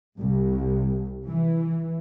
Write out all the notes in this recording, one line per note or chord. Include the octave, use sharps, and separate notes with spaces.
C2
E3